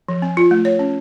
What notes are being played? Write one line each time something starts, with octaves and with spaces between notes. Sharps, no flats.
F3
C4
F4
A3
C#5
C#4